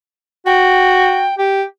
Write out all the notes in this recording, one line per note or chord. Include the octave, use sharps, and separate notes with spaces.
F#4 G5
G4